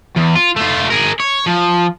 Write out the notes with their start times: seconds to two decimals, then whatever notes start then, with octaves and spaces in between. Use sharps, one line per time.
0.16 E2
0.35 F4
0.56 A3 F4
0.90 G#4 A#4
1.20 C#5
1.46 F3